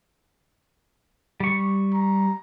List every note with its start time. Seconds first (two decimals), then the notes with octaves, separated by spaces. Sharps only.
1.40 G3 C#6
1.94 A#5